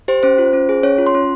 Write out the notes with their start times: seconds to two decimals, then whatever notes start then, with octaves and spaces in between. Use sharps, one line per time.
0.08 G4 C5
0.23 C#4 C5
0.38 F4
0.53 C#4
0.69 G#4
0.83 C#4 C#5
0.98 F4
1.07 C6
1.14 C#4